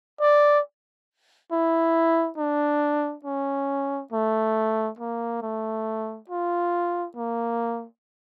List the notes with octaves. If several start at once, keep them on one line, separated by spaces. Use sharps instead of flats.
D5
E4
D4
C#4
A3
A#3
A3
F4
A#3